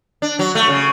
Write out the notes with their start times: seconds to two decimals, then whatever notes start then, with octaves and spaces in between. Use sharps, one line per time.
0.22 D4
0.39 F#3
0.55 A3
0.69 C#3